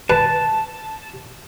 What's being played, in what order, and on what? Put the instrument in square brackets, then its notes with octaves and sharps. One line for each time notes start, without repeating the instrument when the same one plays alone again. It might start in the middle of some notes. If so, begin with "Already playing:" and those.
[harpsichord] B4 [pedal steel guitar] A5